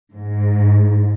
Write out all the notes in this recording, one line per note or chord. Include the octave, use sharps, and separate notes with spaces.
G#2